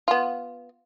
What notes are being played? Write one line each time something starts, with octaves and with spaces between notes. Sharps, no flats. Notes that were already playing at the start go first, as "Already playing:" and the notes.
B3 F4